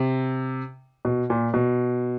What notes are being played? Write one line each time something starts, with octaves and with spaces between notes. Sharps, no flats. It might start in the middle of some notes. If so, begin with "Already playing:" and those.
Already playing: C3
B2
A#2
B2